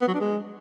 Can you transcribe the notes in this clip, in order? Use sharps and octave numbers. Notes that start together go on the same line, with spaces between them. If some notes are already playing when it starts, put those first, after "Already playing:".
B3
F#3
D4
G#3